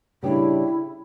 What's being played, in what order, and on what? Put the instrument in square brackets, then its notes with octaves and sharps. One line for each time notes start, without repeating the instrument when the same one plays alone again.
[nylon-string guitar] C#3 G3 D4 [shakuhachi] E4